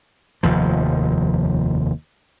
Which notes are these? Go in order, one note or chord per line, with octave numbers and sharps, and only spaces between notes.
F1 D#2 F3